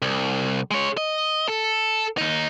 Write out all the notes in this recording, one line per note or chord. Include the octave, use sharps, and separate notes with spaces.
C2
G#3 C#5
D#5
A4
D#2 D#4